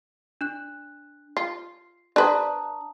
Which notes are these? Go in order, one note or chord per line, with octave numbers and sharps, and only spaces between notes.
D4 F#6
F4 C7
D4 B4 C5 A5 A#5 D#6